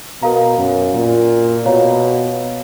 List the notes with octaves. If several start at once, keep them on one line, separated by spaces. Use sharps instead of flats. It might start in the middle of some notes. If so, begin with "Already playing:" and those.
B2 A#4 F5 A#5
F#2
A#2
B2 C#5 F5 A#5